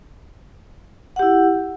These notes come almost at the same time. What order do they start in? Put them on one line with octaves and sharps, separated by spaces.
F#5 G4 E4